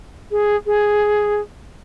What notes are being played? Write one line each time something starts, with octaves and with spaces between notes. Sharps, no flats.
G#4
G#4